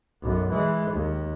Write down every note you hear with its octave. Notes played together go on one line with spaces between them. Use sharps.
B1 F#2
E3 G#3
D#2